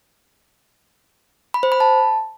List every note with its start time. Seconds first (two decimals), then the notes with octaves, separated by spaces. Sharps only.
1.54 B5
1.63 C5
1.72 B5
1.80 A5